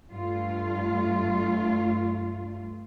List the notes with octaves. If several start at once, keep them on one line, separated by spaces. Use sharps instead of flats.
G2 A3 F4